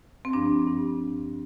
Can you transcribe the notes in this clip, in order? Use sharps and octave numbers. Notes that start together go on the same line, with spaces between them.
C4
G2 F3 D4
G2 F3